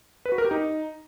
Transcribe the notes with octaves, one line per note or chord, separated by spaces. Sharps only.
B4
F#4
A#4
G4
D#4